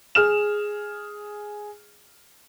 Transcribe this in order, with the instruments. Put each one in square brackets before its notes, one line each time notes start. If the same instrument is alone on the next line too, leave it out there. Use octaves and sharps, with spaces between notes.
[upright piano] G#4 F6 E7